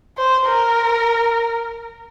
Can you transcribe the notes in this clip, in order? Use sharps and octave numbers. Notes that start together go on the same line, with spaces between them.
C5
A#4